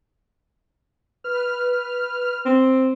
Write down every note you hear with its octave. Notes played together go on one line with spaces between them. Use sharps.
B4 F6
C4